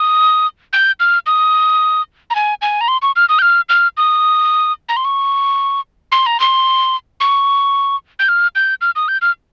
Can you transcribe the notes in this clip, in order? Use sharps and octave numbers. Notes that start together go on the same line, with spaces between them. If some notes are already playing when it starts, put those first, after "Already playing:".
Already playing: D#6
G6
F6
D#6
A#5
G#5
G#5
A#5
C6
C#6
F6
D#6
G6
F6
F6
D#6
A#5
C6
C#6
C6
A#5
C6
C#6
G6
F6
G6
F6
D#6
G6
F6